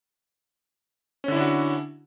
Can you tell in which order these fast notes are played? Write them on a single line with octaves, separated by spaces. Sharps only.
C#4 D3 E4 D4 F#4